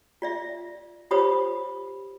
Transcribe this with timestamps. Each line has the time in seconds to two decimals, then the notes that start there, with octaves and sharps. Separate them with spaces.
0.22 F4 D5 E5
1.11 F4 G4 C5 C#5 B5 D#6